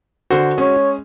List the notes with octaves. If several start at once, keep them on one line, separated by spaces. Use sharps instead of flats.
D3 F#4 C5
G#3 C#4 G#4 C#5